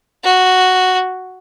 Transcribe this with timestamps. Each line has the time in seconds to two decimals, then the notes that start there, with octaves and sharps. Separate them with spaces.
0.24 F#4